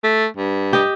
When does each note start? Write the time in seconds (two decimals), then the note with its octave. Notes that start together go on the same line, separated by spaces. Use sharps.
0.04 A3
0.37 G2
0.73 G4 D#5